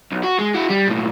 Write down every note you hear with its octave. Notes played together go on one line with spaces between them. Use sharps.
B1
F#4
G#3
E4 F#4
G3
B1 A2